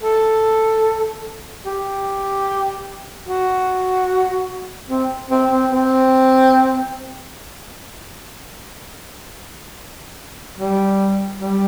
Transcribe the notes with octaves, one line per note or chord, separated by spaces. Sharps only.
A4
G4
F#4
C4
C4
C4
C4
G3
G3